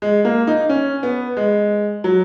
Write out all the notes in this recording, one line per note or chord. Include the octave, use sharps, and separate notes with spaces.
G#3
A#3
D#4
C#4
B3
G#3
F#3